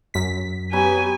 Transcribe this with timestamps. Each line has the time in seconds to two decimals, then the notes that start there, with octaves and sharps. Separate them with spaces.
0.14 F#2 B6
0.73 F#3 B3 G4 G#5